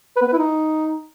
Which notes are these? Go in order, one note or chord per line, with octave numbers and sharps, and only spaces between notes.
B4
B3
B4
E4
D#4